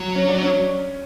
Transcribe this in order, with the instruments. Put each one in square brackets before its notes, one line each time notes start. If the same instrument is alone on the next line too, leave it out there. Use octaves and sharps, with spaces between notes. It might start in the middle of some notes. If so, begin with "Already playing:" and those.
Already playing: [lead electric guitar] F#3
[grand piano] C#4
D4
C#4